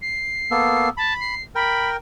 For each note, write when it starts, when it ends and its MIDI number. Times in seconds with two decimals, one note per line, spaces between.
0.01 0.88 96
0.51 0.89 58
0.51 0.89 59
0.51 0.89 69
0.97 1.14 81
0.97 1.35 83
1.20 1.42 96
1.55 1.97 70
1.55 1.97 79
1.55 1.89 83